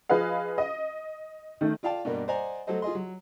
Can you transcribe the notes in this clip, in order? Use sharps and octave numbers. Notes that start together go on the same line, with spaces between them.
F3 G#4 B4 D#5 F5
D#5
D#3 A3
F4 D5 F5 G5 A5
G2 B2 G3 A#3
C5 D5 D#5 F#5 G#5 A#5
F#3 A3 A4 C5 D#5
F4 G#4 D#5 C6
F#3